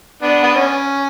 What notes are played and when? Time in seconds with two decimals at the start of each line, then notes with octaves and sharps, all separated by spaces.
0.22 B3 D4
0.43 B3
0.55 C#4